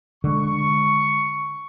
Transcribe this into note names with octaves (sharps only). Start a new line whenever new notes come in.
D3 G#3 C#6